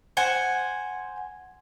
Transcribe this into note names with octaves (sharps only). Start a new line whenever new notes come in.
C5 F#5 G#5